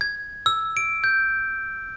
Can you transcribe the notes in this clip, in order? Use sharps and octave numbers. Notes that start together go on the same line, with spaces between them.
G#6
E6
D7
G6